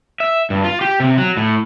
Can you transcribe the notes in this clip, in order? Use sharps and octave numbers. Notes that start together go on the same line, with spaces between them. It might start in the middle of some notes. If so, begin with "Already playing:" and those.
E5
G2
F4
G4
C3
F#3
A2